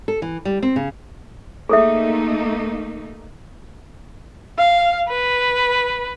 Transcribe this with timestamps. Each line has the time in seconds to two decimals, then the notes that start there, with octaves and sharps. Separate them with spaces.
0.08 A4
0.22 E3
0.45 G3
0.63 C4
0.76 C#3
1.69 A3 A#3 D#4 G#4 A4 E5
4.58 F5
5.09 B4